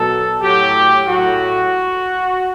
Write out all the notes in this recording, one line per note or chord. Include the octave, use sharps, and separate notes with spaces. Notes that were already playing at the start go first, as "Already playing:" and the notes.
Already playing: B2 F#3 A4
A2 F#3 G4
A2 F#3 F#4